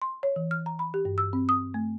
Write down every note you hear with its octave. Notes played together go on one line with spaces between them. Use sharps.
C6
C#5
E3
F6
A#5
B5
G4
G2
E6
C4
D#6
A3